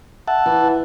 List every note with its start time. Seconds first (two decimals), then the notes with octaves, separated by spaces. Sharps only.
0.28 E5 F#5 A5
0.46 E3